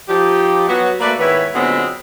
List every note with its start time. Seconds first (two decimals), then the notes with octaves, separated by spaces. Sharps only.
0.09 F3 D#4 G4
0.68 F#3 B3 F#4
1.00 A3 A#3 F#4 B4 D5
1.18 G#2 D#3 B3 E4 B4 C#5
1.54 A#2 D3 F#3 G#3 B3 C4